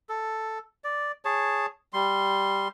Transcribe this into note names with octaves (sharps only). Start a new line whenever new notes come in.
A4
D5
G#4 C#5 A5
G3 C6